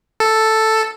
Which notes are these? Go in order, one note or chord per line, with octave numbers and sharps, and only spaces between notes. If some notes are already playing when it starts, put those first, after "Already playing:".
A4